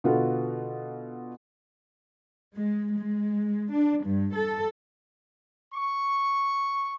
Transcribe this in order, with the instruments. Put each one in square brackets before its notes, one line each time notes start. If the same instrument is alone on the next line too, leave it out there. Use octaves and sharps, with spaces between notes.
[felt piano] B2 D3 B3 F4 F#4 A4
[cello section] G#3
G#3
D4
G2
A4
[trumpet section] C#6